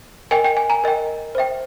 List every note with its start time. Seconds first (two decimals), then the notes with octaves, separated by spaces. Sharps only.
0.31 A#4 D#5 G5 G#5
0.45 G5
0.57 G#5
0.70 G#5 A#5
0.84 A#4 D#5 G5
1.35 C5 E5 G5